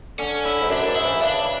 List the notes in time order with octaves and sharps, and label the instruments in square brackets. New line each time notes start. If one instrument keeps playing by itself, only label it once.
[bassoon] D3 [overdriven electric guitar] C#4
[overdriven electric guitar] E4
[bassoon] G#2
[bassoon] F#2 [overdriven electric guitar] D4
[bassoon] G#2
[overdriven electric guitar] E4
[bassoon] E3
[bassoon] C#3 [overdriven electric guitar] D4